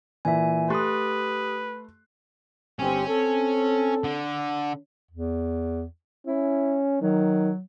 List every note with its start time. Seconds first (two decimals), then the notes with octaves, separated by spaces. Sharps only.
0.25 A#2 E3 E5 G#5
0.70 A3 G4 B4 C6 D#6 F#6
2.79 G1 C4 C#4 G4
3.08 C4 A4
4.04 D3
5.11 E2
6.27 C#4 E4
7.02 D#3 F#3